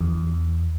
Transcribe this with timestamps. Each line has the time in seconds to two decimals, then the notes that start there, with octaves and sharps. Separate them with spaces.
0.01 E2